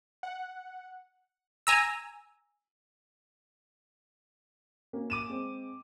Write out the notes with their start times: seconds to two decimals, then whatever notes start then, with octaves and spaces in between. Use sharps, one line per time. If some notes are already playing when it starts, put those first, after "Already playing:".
0.23 F#5
1.67 G#5 A#5 E6
4.93 A#3 C#4 F#4
5.10 D6 D#7 E7
5.30 G#3 C4